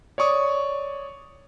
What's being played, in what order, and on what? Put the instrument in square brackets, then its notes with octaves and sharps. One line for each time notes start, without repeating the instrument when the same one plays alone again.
[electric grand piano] C#5 D5 C#6 D#6